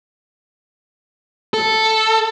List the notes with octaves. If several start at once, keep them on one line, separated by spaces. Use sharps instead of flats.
A4